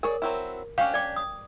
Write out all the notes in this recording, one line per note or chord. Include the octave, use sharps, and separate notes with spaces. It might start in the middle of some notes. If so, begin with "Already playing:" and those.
G#4 A#4 C#5 D5
F#3 C4 E4
C#4 D4 G4 F5
D5 G5 D6
D#6